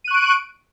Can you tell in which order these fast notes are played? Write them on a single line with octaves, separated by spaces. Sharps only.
D#7 F#6 C#6 D7